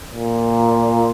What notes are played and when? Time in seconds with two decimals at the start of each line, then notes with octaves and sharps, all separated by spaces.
0.11 A#2